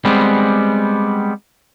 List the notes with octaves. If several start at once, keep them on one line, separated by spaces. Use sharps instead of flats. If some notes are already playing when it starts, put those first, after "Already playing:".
G3 G#3 B3 C4